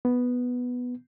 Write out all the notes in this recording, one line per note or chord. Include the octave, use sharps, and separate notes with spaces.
B3